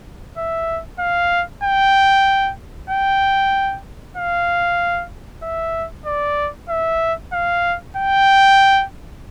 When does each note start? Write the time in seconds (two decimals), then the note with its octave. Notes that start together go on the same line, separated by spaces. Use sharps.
0.37 E5
0.99 F5
1.63 G5
2.90 G5
4.17 F5
5.42 E5
6.06 D5
6.69 E5
7.33 F5
7.96 G5